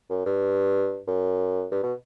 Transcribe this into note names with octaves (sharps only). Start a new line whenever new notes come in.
F#2
G2
F#2
G2
B2